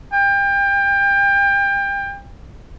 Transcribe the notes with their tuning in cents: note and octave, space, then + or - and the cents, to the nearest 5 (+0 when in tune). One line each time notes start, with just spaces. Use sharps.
G5 +30